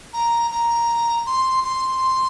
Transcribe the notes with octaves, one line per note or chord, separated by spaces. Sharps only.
A#5
A#5
C6
C6